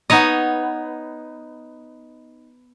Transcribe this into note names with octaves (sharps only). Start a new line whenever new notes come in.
B3 D#4 C#5 D#5